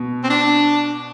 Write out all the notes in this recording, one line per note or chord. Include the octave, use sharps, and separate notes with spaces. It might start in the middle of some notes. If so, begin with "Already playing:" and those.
Already playing: B2
C4
D4